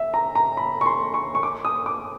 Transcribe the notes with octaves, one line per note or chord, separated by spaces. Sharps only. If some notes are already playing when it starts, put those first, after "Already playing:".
Already playing: E5
A#5
A#5
B5
C#6
C6
C#6
C#6
D6
D#6
D6